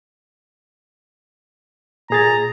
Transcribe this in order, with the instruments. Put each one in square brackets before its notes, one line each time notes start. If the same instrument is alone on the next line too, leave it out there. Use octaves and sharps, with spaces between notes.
[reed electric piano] A#2 G#4 A6 [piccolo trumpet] A#5